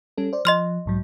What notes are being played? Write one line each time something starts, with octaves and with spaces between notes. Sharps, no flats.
G3 C#4 A4
C5 D5
F3 D#5 C6 F6
B1 G#2 F#3